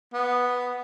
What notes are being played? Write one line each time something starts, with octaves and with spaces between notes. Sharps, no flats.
B3